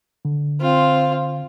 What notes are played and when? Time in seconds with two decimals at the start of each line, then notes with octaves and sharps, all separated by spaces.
0.25 D3
0.61 C4 F4